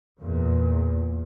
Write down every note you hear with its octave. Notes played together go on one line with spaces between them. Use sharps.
E2 A#2